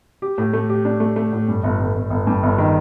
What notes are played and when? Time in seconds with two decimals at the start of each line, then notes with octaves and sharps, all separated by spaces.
0.22 G4
0.38 A2
0.53 A3
0.69 G4
0.85 D4
1.00 A3
1.16 A3
1.33 A2
1.48 G2
1.63 G1
1.80 G1
1.95 G1
2.10 G1
2.27 G2
2.43 G1
2.58 D#3